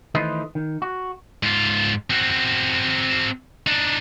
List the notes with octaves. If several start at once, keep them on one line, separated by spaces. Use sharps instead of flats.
D#3 E3 A3 B4 C5 D#5
D#3
F#4
G#2 F4
C4 F#4
D4 D#4